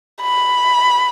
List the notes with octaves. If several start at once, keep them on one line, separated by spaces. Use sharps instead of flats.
B5